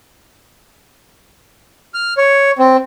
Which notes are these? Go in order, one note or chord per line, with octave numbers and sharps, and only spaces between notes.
F6
C#5
C4